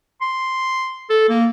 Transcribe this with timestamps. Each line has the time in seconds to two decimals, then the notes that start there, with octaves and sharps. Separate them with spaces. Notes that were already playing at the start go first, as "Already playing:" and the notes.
0.21 C6
1.10 A4
1.29 A#3